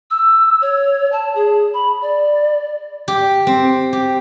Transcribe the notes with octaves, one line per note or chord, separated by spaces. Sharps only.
E6
C#5
A5
G#4
B5
D5
G4
C4
G4